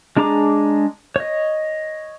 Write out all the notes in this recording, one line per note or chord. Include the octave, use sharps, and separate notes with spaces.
G#3 D4 G#4 A#5 D6
C#5 D#5